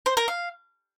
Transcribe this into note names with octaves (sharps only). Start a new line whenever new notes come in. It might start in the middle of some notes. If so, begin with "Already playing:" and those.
C5
A#4
F5